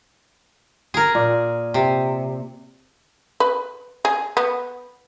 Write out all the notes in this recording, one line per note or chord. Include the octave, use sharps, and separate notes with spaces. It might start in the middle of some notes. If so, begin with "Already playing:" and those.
G#4 A#4
A#2
C3
B4
G#4
B3